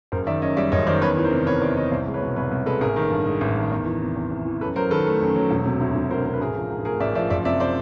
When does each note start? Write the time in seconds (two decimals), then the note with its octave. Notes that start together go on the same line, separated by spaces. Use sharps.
0.12 F#1 A#4 C5
0.27 D#3 D5 E5
0.42 F#2 C#5 D#5
0.57 G3 D5 E5
0.72 F#1 C#5 D#5
0.87 D#3 C5 D5
1.01 E2 B4 C#5
1.17 E3
1.24 A#4 C5
1.32 C3
1.46 E2 B4 C#5
1.61 E2 C5 D5
1.76 E3 C#5 D#5
1.91 C2 C5 D5
2.07 G#3
2.14 B4 C#5
2.22 B2
2.36 C2 B4 C#5
2.51 C2
2.66 G#3 A4 B4
2.81 A1 G#4 A#4
2.96 D#3
3.11 G2
3.26 G#3
3.41 A1
3.56 D#3
3.71 E2
3.86 E3
4.01 C3
4.16 E2
4.31 E2
4.46 E3
4.61 F#2 A4 B4
4.76 F#3 A#4 C5
4.91 D#3 A4 B4
5.06 A3
5.21 F#2
5.36 F#3
5.51 E1
5.66 C3
5.81 D2
5.96 E1
6.11 E1 A#4 C5
6.25 C3 A#4
6.34 B4
6.41 A1 G#4 A#4
6.56 F3
6.70 G#2
6.85 A3 G#4 A#4
7.00 A1 D5 E5
7.15 F3 D5 E5
7.30 F#1 D5 E5
7.45 C3 D5 E5
7.60 C5 D5